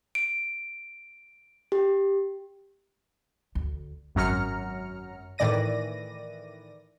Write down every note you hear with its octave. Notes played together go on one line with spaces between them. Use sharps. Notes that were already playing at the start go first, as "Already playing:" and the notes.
D7
G4
D2
G#1 F#2 F#3 A#5 F6 C#7
A2 D#3 E3 D5 A#6 D#7